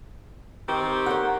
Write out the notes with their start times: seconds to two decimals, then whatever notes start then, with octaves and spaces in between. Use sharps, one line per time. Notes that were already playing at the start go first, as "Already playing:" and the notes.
0.68 D#3 C4 G4
1.06 A#4 C#5 F#5